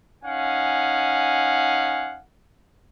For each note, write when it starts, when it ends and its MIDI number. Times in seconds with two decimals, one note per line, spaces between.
0.25 2.19 61
0.25 2.19 63
0.25 2.19 77
0.25 2.19 78
0.25 2.19 80